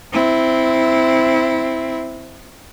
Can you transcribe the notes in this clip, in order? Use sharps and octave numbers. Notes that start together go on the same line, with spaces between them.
C4 E4